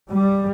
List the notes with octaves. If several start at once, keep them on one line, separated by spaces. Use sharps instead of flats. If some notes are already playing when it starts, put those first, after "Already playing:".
G3